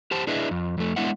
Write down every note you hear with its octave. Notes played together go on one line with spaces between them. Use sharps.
G4 C5 A5
D4 E4 G#4 B4 D#5 E5
F2
F2 A3
G#3 B3 D4 E4 E5 F#5